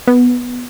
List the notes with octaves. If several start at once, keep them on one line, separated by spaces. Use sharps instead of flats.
B3